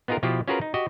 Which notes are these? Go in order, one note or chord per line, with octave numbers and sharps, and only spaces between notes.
B3 D#4 F4 G#4 A#4
B2 F3 E4 F4 G4 B4
C#4 F4 F#4 G#4 A#4 B4
D#4
F#4 G4 D#5